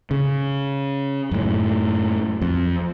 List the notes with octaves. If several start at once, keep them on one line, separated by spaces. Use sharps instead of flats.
C#3
F#2 A2
F2